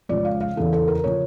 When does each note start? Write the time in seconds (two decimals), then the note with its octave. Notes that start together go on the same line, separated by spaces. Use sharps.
0.09 C#2 C#3 F3 D5
0.25 F5
0.41 F5
0.56 E2 C#3 E3 A4
0.73 A4
0.88 A#4
1.04 C#3 F3 C#5